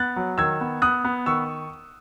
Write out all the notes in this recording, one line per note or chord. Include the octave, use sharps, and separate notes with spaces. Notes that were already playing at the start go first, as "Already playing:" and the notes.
Already playing: B3 F#6 A6
F#3
D#3 E6 G#6
B3
B3 D#6 F#6
B3
D#3 C#6 E6